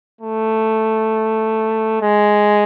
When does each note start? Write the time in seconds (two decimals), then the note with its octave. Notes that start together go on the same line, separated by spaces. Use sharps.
0.21 A3
2.02 G#3